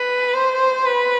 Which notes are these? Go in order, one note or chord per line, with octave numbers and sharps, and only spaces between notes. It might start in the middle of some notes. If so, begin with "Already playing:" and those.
Already playing: B4
C5
B4